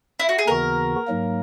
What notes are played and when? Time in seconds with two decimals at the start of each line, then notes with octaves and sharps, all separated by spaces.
0.20 E4
0.29 F#4
0.38 G#4
0.47 D#2 C#3 E3 B3 F#4 A#4
1.07 G#2 F#3 A#3